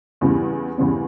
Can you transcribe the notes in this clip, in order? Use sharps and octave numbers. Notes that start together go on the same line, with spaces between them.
E2 C#3 E3 G3 B3
E2 C#3 E3 G3 B3